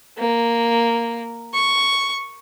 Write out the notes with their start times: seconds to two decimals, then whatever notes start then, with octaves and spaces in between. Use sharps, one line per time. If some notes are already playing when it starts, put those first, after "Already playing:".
0.18 A#3
1.54 C#6